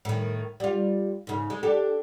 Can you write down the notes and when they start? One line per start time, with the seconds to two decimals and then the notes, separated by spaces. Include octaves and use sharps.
0.05 A2 D#3
0.60 G3 F4
1.27 G#2 C#3
1.50 G#3
1.63 D4 G4 A4